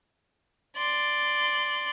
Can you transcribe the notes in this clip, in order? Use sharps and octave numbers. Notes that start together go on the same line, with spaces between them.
D5 C6